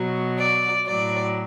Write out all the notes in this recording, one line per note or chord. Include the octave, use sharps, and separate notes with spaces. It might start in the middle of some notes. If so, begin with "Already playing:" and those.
Already playing: B2 F#3
D5
A2 F#3 D5